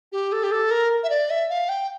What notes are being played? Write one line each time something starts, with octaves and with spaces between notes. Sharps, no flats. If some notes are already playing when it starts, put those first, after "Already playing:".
G4
A4
G4
A4
A#4
E5
D5
E5
F5
G5